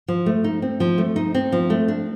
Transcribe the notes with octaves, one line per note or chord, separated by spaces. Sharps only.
F3
A3
D#4
C4
F3
A3
D#4
C4
F3
A3
D4